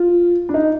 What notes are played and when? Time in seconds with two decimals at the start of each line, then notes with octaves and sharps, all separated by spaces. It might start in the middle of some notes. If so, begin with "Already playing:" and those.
Already playing: F4
0.49 D4
0.54 D#4